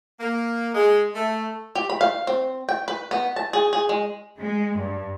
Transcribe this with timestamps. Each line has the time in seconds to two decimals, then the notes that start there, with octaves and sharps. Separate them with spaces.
0.20 A#3
0.75 G#3
1.15 A3
1.75 G4
1.90 B5
2.01 F5
2.27 C4
2.69 G5
2.88 B4
3.11 B3
3.36 A5
3.53 G#4
3.73 G#4
3.89 G#3
4.39 G#3
4.76 G2